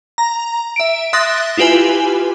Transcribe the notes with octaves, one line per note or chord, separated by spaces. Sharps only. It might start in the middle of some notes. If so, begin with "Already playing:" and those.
A#5
E5 D7
E5 C6 D#6 F#6 A6 A#6
E4 F4 G4 B4 G#5